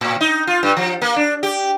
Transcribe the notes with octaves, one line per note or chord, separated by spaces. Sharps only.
A2
D#4
F4
G2
F3
A#3
D4
G4